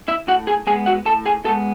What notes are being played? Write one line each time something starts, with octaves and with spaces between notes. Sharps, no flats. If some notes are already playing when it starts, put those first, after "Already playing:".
E4 E5
A2 F#4 F#5
G#4 G#5
G#3 B3 G#4 G#5
F#4 F#5
A2 A4 A5
G#4 G#5
G#3 B3 A4 A5